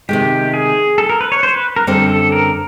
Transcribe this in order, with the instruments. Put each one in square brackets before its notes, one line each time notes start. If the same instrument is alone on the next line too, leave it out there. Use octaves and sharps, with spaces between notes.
[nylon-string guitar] C3 D#3 G#3 [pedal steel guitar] G4
[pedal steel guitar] G#4
A4
A#4
B4
C#5
C5
B4
A#4
[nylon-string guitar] F#2 D3 G3 C4 [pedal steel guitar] A4
[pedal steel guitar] A4
A#4